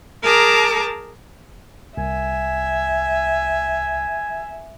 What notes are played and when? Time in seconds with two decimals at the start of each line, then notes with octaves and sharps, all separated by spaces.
0.23 G#4 A#4 A5 A#5 D6 G6
1.97 C2 E5 G#5